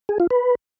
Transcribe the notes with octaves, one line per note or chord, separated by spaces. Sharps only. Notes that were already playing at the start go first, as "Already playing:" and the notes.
G#4
F4
B4